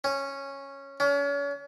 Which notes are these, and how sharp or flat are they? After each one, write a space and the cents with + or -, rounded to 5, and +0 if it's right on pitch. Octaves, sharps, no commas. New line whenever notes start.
C#4 -10
C#4 +35